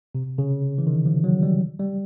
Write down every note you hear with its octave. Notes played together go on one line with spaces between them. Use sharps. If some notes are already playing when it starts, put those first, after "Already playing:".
C3
C#3
E3
D#3
F3
F#3
G3
G3